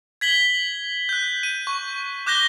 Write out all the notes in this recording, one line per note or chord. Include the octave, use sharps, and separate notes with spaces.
G#6 B6 F#7 G7
F#6 G6
D#7
C#6
D6 F#6 G6 A#6 G7